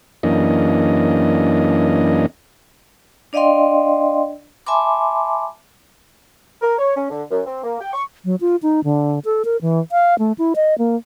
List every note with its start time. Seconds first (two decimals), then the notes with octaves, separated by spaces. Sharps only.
0.23 F#2 E3 A#3 C#4 D4 D#5
3.33 D4 D5 D#5 F5 G5 C6
4.66 E5 G#5 A5 B5 C6 D6
6.62 A#4
6.79 C#5
6.96 C#4
7.10 D3
7.31 F#2
7.46 C4
7.64 A#3
7.80 G5
7.93 C#6
8.25 F#3
8.41 F4
8.62 D#4
8.84 D3
9.25 A4
9.45 A#4
9.62 E3
9.92 F5
10.19 A3
10.38 E4
10.56 D#5
10.78 A#3